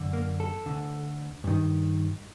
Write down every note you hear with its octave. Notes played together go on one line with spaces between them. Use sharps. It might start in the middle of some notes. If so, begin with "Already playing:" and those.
Already playing: F#2 D3
A#3
A4
D2 D3
G2 D#3